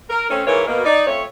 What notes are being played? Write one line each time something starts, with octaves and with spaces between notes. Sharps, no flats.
A#4
A3 C4 C#4
G#2 E3 A#3 A#4 C#5
B2 A#3
D#4 D5
F2 A3 C#5